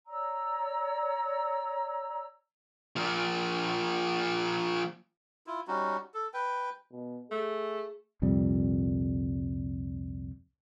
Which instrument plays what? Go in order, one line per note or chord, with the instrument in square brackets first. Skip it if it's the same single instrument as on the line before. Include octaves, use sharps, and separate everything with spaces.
[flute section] C#5 D5 A#5 E6
[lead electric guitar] F3 A#3
[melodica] E4 F4
G3 C#4 D#4 F#4
A4
B4 G5
[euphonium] B2
[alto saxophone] A3 [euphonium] G#4
[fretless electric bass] C2 F2 A#2 G3